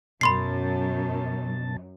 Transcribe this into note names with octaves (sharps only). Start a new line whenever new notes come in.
F#2 B2 A5 B5 C6 C7